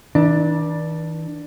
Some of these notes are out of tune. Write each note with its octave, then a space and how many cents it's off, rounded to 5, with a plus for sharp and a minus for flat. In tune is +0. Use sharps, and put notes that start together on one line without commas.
E3 -45 D4 +5